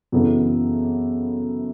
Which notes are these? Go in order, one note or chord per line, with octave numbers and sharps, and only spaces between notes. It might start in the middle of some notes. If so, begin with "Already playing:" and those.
F#2 C#3 E3 B3 A4